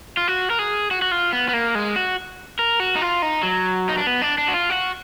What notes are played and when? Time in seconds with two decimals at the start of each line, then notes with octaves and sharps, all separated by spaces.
0.17 F4
0.28 F#4
0.50 A#4
0.59 G#4
0.91 F#4
1.02 F#4
1.11 F4
1.33 B3
1.49 B3
1.54 A#3
1.75 G#3
1.96 F#4
2.59 A#4
2.80 F#4
2.96 D#4
3.01 F4
3.22 D#4
3.43 F#3
3.89 D#4
3.98 D4
4.07 B3
4.22 D4
4.38 D4
4.48 F#4
4.54 F4
4.70 F#4